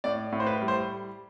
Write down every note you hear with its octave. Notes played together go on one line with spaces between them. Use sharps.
A2 D5
A2
C5
B4
G3
C5